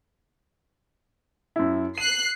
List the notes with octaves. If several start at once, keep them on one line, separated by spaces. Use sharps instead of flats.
F#2 E4
F#6 C7 D#7